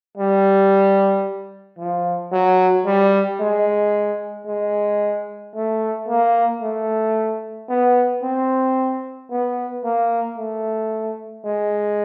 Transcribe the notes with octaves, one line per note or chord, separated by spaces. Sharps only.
G3
F3
F#3
G3
G#3
G#3
A3
A#3
A3
B3
C4
B3
A#3
A3
G#3